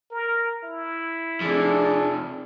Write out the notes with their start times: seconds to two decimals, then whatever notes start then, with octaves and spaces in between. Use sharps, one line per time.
0.11 A#4
0.64 E4
1.42 C3 F3 D4 G#4 A4